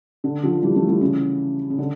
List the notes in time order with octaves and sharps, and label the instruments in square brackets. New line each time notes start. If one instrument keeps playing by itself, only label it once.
[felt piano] D3
D3 F3
E3 G3
F3 A3
E3 G3
C#3 E3
C#3
D3